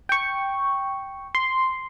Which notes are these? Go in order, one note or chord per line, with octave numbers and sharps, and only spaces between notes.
G5 C#6
C6